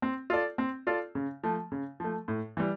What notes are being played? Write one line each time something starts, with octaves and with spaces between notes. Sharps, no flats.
C4
F4 A4 D5
C4
F4 A4 D5
C#3
F3 A3
C#3
F3 A3
A2
E3 G3